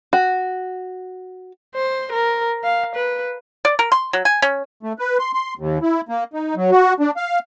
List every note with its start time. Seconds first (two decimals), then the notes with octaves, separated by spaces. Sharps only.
0.13 F#4
1.76 C5
2.12 A#4
2.64 F5
2.95 B4
3.65 D5
3.79 A#4
3.92 C6
4.13 F#3
4.25 G#5
4.42 C#4
4.83 A3
4.99 B4
5.19 C6
5.34 C6
5.59 D#2
5.82 E4
6.09 A#3
6.33 D#4
6.56 F#3
6.71 F#4
7.00 D4
7.17 F5